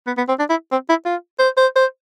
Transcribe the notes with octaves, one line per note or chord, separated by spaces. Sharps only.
B3
B3
C4
D4
E4
C4
E4
F4
C5
C5
C5